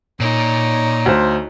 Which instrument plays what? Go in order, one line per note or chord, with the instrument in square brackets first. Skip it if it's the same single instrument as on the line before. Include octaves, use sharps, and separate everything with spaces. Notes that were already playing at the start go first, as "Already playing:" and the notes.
[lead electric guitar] A#2 [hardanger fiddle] D#4 C#5
[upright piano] D2 C5